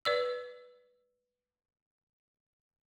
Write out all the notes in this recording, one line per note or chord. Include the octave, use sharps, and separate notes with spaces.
B4 D5 E6